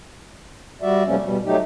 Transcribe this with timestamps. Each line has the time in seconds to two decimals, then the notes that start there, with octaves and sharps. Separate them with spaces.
0.82 G3 F#4 D5 E5
1.06 C3 F3 G3 A3 A#3 C#4
1.21 B2 G3
1.45 F#3 A3 D#4 G4